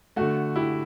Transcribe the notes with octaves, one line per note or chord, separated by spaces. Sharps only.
D3 A3 F#4
E4 G4